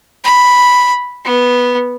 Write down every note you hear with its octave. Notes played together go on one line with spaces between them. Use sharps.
B5
B3